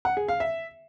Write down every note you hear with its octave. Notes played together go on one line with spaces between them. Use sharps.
F#5
G#4
F5
E5